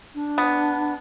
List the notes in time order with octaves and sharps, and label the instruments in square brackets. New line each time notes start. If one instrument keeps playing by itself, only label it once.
[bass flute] D4
[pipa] B3